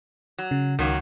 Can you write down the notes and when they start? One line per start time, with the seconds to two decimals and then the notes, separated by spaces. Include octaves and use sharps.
0.38 F#3
0.51 C#3
0.79 C#2 D#3 F#3 A#3